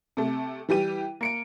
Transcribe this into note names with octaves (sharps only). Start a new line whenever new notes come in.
C3 A3
E3 G3 G4 D#7
A#3 C#7 D7